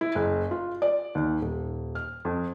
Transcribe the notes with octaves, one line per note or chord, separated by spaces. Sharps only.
E4
F#1
F4
D5
D#2
D#1
F6
F2